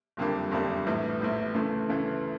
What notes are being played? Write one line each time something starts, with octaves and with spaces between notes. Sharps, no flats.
F#1 F2 D3 G3 A#3
F#1 F2 D3 G3 A#3
A#1 A2 E3
A#1 A2 E3
D2 C#3 E3 A3
D2 C#3 E3 A3